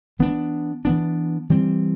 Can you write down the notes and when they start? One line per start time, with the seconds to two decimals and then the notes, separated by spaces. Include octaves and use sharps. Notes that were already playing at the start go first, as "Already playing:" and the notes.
0.19 E3 B3 D4
0.85 E3 B3 D4
1.50 E3 G3 C4